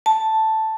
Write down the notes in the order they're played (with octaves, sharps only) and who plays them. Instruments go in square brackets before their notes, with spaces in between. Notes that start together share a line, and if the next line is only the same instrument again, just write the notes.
[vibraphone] A5